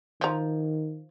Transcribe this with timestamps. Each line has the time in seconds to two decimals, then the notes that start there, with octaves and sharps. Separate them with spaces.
0.21 D#3 F3 A#5